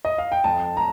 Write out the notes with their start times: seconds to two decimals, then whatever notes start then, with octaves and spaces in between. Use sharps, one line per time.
0.05 D#5
0.18 F5
0.32 G5
0.44 F2 A5
0.77 A#5